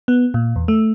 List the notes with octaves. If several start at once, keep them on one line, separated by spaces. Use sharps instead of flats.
B3
A#2
E2
A3